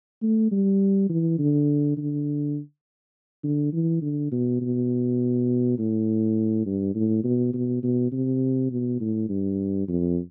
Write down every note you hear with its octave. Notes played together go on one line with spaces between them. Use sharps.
A3
G3
E3
D3
D3
D3
E3
D3
B2
B2
A2
G2
A2
B2
B2
B2
C3
B2
A2
G2
F2